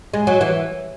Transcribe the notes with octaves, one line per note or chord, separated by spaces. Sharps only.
G#3
F#3
E3